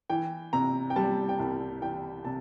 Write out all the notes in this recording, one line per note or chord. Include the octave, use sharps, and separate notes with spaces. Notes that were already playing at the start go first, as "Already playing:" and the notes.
E3 G5
C3 A#5
G5
G3 A5
G5
C2 A5
E3 G5
C3 A5